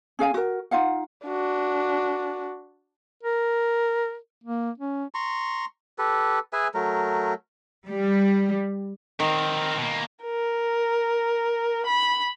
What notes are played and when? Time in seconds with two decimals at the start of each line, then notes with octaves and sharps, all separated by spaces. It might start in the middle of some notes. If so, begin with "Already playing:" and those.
0.19 C#4 G#4 F5 G#5
0.34 F#4 A#4
0.71 D#4 F4 F5 F#5
1.25 D4 F#4
3.23 A#4
4.44 A#3
4.78 C#4
5.14 A#5 C6 C#6
5.98 G4 A4 B4
6.53 G#4 B4 E5 G#5
6.74 F#3 A3 A#4
7.87 G3
9.20 D#3 C4 A#4
9.78 B2 A#3
10.24 A#4
11.86 B5